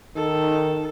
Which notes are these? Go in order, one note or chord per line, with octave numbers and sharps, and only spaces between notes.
D#3 D#4 A4